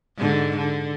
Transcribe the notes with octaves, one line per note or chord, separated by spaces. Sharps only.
G#2 D3
D3